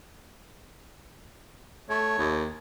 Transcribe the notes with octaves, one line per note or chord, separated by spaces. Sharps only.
A3 C#5
D#2